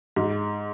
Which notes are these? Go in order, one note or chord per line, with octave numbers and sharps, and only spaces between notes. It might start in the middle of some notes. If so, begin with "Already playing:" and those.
G#2